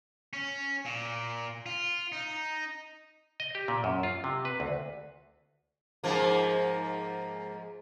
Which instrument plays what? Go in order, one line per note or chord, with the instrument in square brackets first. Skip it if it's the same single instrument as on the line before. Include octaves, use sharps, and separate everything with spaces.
[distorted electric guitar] C#4
A#2
F4
D#4
[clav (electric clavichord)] D#5
G4
A#2
F#2
F4
C3
B4
D2
[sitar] G#2 F3 A#3